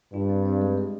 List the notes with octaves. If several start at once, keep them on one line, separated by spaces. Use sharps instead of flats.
G2 F4
C4
C4
G#3
G#3